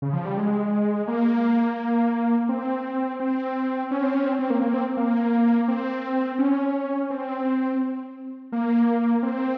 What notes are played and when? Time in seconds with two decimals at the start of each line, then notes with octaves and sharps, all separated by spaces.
0.02 C#3
0.13 F3
0.25 G3
0.37 G#3
1.08 A#3
2.49 C4
3.20 C4
3.91 C#4
4.03 C4
4.14 C#4
4.26 C4
4.39 C4
4.50 A#3
4.61 A#3
4.74 C4
4.97 A#3
5.68 C4
6.39 C#4
7.10 C4
8.52 A#3
9.23 C4